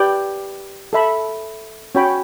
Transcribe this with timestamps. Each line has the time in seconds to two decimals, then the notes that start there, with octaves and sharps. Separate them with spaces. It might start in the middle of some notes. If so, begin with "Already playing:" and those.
Already playing: G4 B4 D5 G5
0.93 A4 E5 B5
1.95 C#4 F#4 C#5 G5 B5